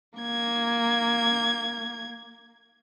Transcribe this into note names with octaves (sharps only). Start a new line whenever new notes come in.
A#3 G#6